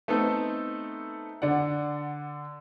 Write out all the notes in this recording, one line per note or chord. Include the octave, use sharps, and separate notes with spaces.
A3 B3 C4 D#4 A4
D3 D5 F#5